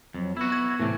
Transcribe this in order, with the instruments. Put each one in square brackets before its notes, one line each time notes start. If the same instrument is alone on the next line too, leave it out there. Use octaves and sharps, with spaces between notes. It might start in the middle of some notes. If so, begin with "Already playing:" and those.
[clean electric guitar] F2 [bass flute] F#3
[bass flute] B3 [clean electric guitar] E4 F#4
[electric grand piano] G#6
[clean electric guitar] A2 C3 [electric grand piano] E3 A3